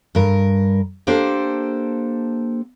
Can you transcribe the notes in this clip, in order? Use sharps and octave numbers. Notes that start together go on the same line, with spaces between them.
G2 A#4
A#3 D4 G4 A4 C5